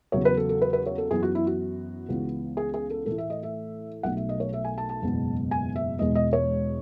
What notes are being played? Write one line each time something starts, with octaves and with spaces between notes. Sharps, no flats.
E2 C#3 F#3 C#5
B4
A4
A4
B4
B4
C#5
A4
F#2 E3 B3 G#4
F#4
E4
F#4
C#2 C#3 E3 B3
G#4
G#4
A4
A2 E3 A3 A4
E5
D#5
E5
B1 B2 A3 F#5
E5
D#5
C#5
E5
G#5
A5
A5
F#1 E2 B2 G#3 B3
G#5
E5
E1 E2 B2 G#3 D#5
D#5
C#5